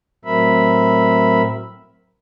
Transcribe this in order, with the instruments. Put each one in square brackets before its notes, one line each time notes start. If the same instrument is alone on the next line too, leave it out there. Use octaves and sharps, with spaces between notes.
[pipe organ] A2 F#3 C4 A#4 E5 B5